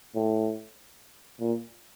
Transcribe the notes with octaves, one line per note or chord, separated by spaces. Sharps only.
A2
A#2